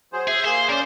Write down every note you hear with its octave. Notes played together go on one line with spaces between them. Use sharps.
F#3 G#4 C5
G#4 E5 G6
A#3 G#4 C5
C#4 A#4 C5 D5